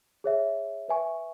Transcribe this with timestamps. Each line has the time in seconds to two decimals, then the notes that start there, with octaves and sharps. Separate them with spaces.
0.24 G#4 C#5 E5
0.88 B4 E5 G#5 C#6